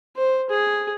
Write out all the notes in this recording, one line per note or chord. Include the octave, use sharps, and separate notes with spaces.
C5
G#4